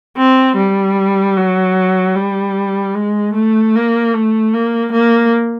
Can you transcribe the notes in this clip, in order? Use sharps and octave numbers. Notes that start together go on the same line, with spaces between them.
C4
G3
F#3
G3
G#3
A3
A#3
A3
A#3
A#3